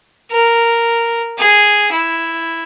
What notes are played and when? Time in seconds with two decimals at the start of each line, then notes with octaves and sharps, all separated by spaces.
0.31 A#4
1.38 G#4
1.92 E4